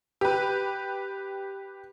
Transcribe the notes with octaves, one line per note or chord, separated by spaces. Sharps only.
G4 B4